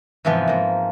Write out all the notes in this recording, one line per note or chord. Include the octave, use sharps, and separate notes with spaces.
G#2 C3 E3 F3 B3
G#2 A#3